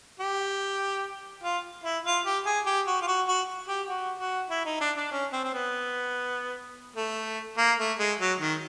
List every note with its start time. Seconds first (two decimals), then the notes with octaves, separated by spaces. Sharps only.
0.20 G4
1.43 F4
1.84 E4
2.05 F4
2.25 G4
2.46 G#4
2.66 G4
2.87 F#4
3.01 F4
3.08 F#4
3.28 F#4
3.68 G4
3.89 F#4
4.20 F#4
4.50 E4
4.66 D#4
4.81 D4
4.97 D4
5.11 C#4
5.33 C4
5.44 C4
5.54 B3
6.96 A3
7.57 A#3
7.79 A3
7.99 G#3
8.20 F#3
8.40 D#3